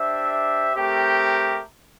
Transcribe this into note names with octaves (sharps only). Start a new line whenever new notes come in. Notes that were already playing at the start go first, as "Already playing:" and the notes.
Already playing: D4 G4 C5 E5
A3 C4 G4 A#4